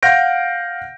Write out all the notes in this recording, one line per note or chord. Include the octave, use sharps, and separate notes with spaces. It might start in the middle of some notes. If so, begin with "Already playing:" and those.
F5 F#5 F6 G6 A#6 D7